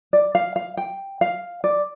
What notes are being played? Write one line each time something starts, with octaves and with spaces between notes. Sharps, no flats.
D5
F5
F5
G5
F5
D5